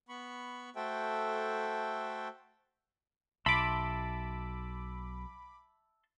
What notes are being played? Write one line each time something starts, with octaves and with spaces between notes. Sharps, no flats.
B3 B5 C#6
A3 F#4 A4 C5 E5 G5
B1 E5 A5 B5 C6 D6